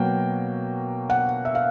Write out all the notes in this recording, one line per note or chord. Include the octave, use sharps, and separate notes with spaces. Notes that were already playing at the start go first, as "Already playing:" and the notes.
Already playing: B2 F#3 A#3 G5
F#5
E5
F5